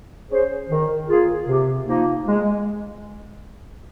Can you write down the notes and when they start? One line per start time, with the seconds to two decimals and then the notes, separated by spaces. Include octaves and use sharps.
0.30 C#4 G#4 C5
0.69 D#3
1.08 A#3 F4 G#4
1.48 C3
1.86 F3 A#3 D#4
2.26 G#3